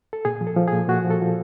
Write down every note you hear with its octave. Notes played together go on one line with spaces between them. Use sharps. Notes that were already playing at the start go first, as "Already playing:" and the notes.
A4
A#2 G#4
F3
A4
F3
A#2 G#4
A#2 F#4
F3
A4
F3